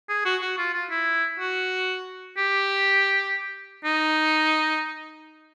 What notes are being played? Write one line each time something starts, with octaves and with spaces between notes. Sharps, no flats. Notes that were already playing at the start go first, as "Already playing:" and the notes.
G#4
F#4
F#4
F4
F4
E4
F#4
G4
D#4